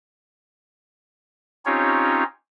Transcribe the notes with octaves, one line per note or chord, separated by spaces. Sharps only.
C4 C#4 D#4 F4 G4 C#5